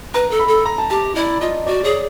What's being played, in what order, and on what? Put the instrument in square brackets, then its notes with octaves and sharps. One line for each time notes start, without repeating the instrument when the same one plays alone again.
[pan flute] B4 [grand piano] A#5
[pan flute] A4
[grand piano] B5
[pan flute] A4
[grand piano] A#5
A5
[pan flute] G4 [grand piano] A5
[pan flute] E4 [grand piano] D5
[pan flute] F4 [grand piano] D#5
[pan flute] F#4 [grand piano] D5
[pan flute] G#4 [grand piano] C#5